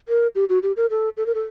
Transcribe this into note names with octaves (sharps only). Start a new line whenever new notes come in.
A#4
G4
F#4
G4
A#4
A4
A4
A#4
A4